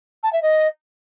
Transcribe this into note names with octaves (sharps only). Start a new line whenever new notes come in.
A5
E5
D#5